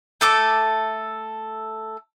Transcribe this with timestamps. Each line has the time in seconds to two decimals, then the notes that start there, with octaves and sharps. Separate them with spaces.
0.21 A3 A4 D6